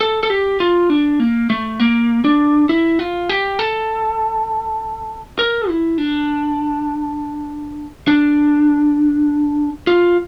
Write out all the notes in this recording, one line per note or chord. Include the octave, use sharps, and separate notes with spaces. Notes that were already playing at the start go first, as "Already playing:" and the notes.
A4
A4
G4
F4
D4
A#3
A3
A#3
D4
E4
F4
G4
A4
A#4
E4
D4
D4
F4